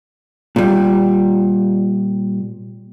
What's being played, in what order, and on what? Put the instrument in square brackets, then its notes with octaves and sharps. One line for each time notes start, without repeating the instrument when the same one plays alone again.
[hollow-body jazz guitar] A#2 G3